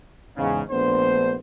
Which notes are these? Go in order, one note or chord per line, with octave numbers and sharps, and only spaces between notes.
E2 G#2 C#3
A#1 A3 B3 D4 C5